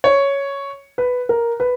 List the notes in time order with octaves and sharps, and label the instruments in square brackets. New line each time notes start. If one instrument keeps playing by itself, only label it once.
[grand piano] C#5
B4
A#4
B4